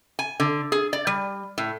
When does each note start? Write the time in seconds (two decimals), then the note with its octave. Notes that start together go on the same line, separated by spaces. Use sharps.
0.19 G#5
0.40 D3
0.72 G#4
0.93 D5
1.07 G3
1.58 A2